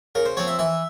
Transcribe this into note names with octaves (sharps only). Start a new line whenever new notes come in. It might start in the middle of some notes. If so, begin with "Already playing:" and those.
C#3 A#4
C5
F3 C4 C#5
E5
E3 E5